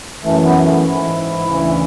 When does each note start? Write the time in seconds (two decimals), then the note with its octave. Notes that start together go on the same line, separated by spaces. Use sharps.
0.24 F#2 E3 A3
0.44 B3
0.65 A3
0.85 G#2 E3 E4
1.47 D2 C#3 E3